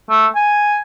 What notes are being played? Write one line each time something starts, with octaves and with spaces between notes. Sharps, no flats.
A3
G#5